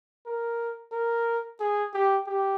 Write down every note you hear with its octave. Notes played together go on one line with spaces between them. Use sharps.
A#4
A#4
G#4
G4
G4